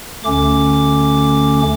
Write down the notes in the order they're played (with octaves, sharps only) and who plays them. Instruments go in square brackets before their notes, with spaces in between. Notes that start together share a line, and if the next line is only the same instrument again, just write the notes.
[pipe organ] D2 D3 A3 C#4 D6